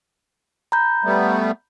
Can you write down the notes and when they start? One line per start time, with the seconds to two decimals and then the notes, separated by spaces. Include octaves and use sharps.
0.72 A#5 B5 G6
1.04 G3 A3 B3